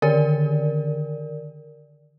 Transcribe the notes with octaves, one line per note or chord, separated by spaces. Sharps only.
D3 D#3 A#4 D5